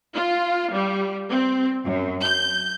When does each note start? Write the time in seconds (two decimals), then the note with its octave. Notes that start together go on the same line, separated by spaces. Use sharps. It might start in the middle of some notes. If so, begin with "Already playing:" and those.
0.14 F4
0.73 G3
1.30 C4
1.84 F#2
2.22 G6